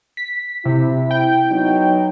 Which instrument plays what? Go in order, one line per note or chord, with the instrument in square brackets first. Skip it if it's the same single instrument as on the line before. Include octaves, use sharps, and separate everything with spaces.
[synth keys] B6
[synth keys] C3 [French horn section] E4
[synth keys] G5
[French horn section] F#3 B3 D#4